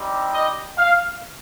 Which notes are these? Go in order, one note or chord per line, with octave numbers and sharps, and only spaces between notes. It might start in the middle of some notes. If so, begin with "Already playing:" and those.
Already playing: G3 C4 D#4 G4
D#5
F5